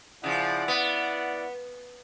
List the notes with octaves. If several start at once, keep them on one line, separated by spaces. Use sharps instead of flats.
C#3 F3 E4 D5 F#5
B3